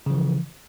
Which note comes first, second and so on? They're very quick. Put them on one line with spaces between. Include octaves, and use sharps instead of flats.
C#3 F3 E3